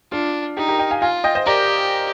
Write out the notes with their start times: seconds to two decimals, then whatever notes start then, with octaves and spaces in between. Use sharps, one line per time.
0.12 D4 F4
0.57 D#4 G4
0.68 G4 A#4
0.79 D#5 G5
0.91 F5 G#5
1.01 F4 F5 G#5
1.24 D#5 G5
1.35 C5 D#5
1.46 G4 A#4 D5